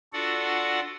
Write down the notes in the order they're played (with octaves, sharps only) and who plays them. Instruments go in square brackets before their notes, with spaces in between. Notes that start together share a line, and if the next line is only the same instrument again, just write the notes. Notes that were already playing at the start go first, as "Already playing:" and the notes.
[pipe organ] D4 F4 F#4 A4 D5 F#5